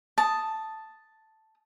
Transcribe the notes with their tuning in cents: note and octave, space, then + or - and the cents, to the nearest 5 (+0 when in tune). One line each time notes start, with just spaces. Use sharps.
A5 +0 D#6 +0